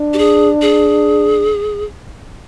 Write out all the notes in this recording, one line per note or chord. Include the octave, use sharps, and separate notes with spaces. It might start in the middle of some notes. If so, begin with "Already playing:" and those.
Already playing: D4
G4
G#4
G#4